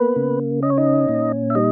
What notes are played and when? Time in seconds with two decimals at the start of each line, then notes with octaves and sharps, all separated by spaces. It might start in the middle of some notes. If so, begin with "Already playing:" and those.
Already playing: A#3 B3 B4
0.16 C#3
0.62 C#4 D#5
0.70 C#5
0.78 D#4 D#5
1.09 A#2
1.50 E5
1.55 G3 D#4 D#5